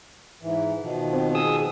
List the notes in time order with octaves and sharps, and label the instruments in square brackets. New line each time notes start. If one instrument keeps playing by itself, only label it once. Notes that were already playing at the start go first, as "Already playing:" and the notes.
[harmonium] G#2 E3
B2 D#3 F3
[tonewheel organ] C4
G#4 D#6 E6